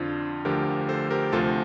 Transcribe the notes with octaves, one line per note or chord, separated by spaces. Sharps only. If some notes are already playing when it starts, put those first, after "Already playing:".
Already playing: F2 D3 F3 D4 F4
D2 D3 F3 G4 A#4
A4 C5
G4 A#4
D2 C3 F3 F4 A4